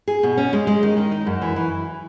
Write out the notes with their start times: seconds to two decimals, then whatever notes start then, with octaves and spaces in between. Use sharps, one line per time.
0.08 G#4
0.23 B2
0.37 C#4
0.53 G#3
0.67 G#3
0.83 D#3
0.97 D#3
1.11 D#4
1.26 F#2
1.41 E3
1.56 E3